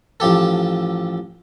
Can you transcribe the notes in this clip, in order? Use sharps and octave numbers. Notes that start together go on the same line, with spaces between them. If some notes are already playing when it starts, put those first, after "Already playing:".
A1 F3 G4 A4